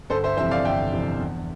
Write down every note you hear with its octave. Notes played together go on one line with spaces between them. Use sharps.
G1 A4 C5
C5 E5
F2 C3 E3 C5 E5
D5 F5
G1 E5 G5
F2 C3 E3
E2